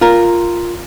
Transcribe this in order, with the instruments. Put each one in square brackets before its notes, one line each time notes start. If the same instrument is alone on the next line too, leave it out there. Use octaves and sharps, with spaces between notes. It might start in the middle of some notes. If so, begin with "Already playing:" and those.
[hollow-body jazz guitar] F4 A#4